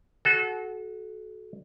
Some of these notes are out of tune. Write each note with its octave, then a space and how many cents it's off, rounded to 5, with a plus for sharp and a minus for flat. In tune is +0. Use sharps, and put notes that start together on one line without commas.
F#4 +0 A4 -30